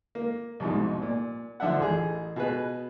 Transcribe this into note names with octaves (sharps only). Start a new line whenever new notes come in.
A#3
C2 F2 G#2 B2
A#2
D3 F3 D4 E5 F#5
A1 G#4
B2 G#4 B4